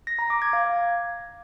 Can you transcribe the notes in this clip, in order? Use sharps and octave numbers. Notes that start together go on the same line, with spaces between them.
A#6
A#5
D6
G#6
F5